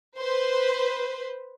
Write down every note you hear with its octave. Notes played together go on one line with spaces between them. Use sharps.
B4 C5